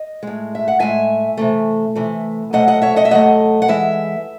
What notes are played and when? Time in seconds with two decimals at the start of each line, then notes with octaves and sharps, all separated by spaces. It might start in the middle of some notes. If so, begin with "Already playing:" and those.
Already playing: D#5
0.23 A2 G#3
0.55 E5
0.68 F#5
0.80 A2 G#3 E5 G#5
1.37 C3 E3 A3
1.95 C3 E3 A3
2.53 C3 F#3 A3 D#5 F#5
2.68 D#5 F#5
2.82 C#5 E5
2.96 D#5 F#5
3.05 E5
3.11 C3 F#3 A3 D#5 F#5
3.62 F#5
3.68 E3 G#3 E5